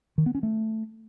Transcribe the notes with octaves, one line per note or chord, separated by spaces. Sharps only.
D#3
B3
C#4
A3